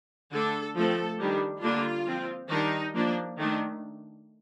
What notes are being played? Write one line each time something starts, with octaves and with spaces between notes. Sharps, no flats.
D3 A3 D4 A4
F3 A3 C4 A4
D#3 G3 D4
D3 G3 A#3 D4 F4
F3 C4
D#3 G3 D4 D#4
F3 A#3 D4
D#3 A3 D4